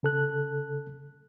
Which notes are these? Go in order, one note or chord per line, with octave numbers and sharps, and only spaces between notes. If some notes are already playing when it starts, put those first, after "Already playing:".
C#3 A4 F#6